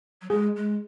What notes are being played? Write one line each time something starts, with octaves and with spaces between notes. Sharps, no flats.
F#3
G#3 G#4
G#3